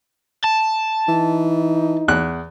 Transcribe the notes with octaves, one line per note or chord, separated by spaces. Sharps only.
A5
E3 D#4
E2 F#6